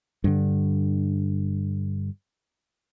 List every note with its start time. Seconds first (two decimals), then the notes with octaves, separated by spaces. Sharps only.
0.24 G2 D3